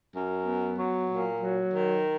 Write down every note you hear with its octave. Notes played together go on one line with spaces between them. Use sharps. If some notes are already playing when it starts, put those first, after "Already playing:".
F#2
B3
F#3
A#2
F#3
D#3